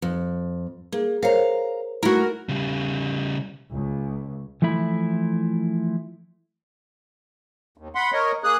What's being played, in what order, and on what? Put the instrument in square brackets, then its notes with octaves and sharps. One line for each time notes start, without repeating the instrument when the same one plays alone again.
[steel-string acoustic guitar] F2
[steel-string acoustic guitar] A#3 [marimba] G#4
[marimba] A#4 C5 C#5 [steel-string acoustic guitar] F5 A#5
[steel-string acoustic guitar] A3 E4 [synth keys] F#4 A#4
[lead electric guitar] C#3 G3
[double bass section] C#2
[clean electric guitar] E3 F3 A3 E4 B5
[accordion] D#2
F#5 B5 C6
A#4 C#5 D#5
A#3 G#4 D#6 F#6